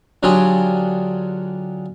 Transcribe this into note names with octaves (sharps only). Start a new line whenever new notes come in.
D3 F#3 D4 F4 G4 G#4